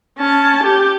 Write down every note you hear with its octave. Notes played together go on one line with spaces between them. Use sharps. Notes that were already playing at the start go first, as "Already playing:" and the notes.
C#4 A5
G4